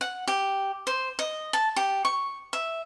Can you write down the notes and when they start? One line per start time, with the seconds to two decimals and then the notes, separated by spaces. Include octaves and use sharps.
0.01 F#5
0.28 G4
0.87 C5
1.19 D#5
1.53 A5
1.76 G4
2.05 C#6
2.53 E5